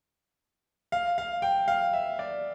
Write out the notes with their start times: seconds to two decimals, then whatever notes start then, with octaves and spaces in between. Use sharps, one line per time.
0.92 F5
1.18 F5
1.42 G5
1.68 F5
1.93 E5
2.19 D5